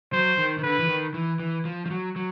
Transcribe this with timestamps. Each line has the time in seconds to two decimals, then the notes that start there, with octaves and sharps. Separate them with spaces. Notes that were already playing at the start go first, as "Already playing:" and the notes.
0.12 F#3 C5
0.38 D#3
0.58 D#3
0.63 D3 B4
0.79 E3
0.88 D#3
1.14 E3
1.40 E3
1.65 F3
1.86 F3
1.90 F#3
2.16 F#3